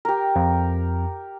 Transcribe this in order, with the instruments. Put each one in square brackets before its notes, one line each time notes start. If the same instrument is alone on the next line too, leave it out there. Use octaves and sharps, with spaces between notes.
[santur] G4 A#4
[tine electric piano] F2